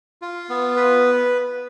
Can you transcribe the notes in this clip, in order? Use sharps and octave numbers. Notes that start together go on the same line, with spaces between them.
F4
B3
B4